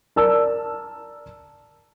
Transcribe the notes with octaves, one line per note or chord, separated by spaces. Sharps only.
A#4 D5 A5 E6